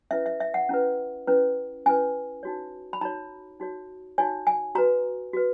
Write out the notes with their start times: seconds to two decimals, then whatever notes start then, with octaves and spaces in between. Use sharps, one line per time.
0.11 C#4 E4 B4 E5
0.26 E5
0.40 E5
0.54 F#5
0.69 C#4 E4 B4
1.27 C#4 E4 B4
1.86 C#4 E4 B4 G#5
2.43 D#4 F#4 C#5
2.93 B5
3.01 D#4 F#4 C#5 A#5
3.60 D#4 F#4 C#5
4.18 D#4 F#4 C#5 G#5
4.47 G#5
4.75 F#4 B4 A#5
5.33 F#4 B4